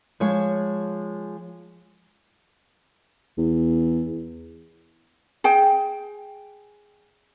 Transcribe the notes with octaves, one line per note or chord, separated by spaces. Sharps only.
F3 G#3 C#5
E2
G#4 G5